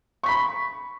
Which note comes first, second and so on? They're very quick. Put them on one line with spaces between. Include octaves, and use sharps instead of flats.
C#6 B6 B5